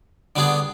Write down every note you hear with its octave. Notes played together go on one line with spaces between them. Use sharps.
D3 G3 B3 D4 G#4